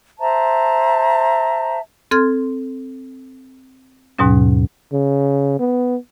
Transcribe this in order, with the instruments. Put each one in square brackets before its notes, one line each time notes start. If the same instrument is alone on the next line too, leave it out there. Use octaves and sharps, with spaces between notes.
[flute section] C5 E5 A5 A#5
[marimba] C4 A4 C6 F6 G#6
D#2 G#2 B2 F#3 C#4
[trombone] C#3
B3